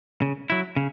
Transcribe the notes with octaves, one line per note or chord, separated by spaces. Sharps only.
C#3
F#3 E4
C#3